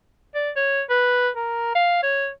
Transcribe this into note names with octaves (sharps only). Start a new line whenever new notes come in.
D5
C#5
B4
A#4
F5
C#5